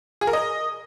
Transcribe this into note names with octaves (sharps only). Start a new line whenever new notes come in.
G#4
A#4
D#5